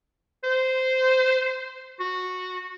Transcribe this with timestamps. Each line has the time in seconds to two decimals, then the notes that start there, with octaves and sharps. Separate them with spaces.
0.44 C5
2.00 F#4